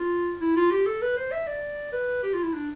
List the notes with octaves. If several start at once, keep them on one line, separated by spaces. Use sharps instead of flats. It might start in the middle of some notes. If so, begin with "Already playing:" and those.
Already playing: F4
E4
F4
G4
A4
B4
C5
E5
D5
B4
G4
F4
E4
D4